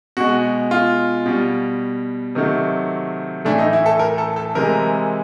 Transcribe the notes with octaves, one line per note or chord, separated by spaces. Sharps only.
B2 G#3 F#4
F4
B2 G3
C3 D#3 F#3 A3
A2 E3 A3 D4
D#4
E4
A4
A#4
A4
A4
C3 E3 G#3 A#4